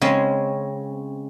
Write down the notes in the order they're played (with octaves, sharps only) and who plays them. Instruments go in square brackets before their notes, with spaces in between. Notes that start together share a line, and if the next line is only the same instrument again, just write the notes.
[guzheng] C#3 G#3 C4 C#4